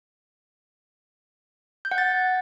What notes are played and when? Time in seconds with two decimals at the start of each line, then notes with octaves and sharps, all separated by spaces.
1.85 G6
1.91 F#5
1.98 A6